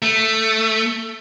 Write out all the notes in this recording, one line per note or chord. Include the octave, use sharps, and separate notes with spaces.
A3